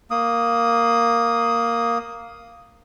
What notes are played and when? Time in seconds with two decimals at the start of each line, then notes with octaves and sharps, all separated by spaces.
0.11 A#3 D#6